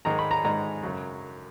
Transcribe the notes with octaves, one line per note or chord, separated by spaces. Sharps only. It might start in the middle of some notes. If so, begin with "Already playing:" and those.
G#2 D#3 G#3 D#4 A#5
B5
A#5
G#2 D#3 G#3 D#4 A#5
F#2 C#3 F#3